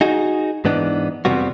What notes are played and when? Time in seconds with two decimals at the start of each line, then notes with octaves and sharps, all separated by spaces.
0.01 D#4 F#4 G#4
0.65 G#2 E3 B3 D4 D#4
1.25 F2 C3 F3 G3 B3 F#4